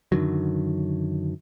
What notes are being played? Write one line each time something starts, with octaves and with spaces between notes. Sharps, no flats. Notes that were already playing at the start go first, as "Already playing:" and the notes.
F#2 D3 D#3 F#3